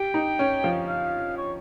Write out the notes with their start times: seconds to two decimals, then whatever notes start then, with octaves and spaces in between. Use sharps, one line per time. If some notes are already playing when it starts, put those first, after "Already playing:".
Already playing: G4 G5
0.14 D#4
0.39 C#4
0.64 F3
0.88 F5
1.37 C#5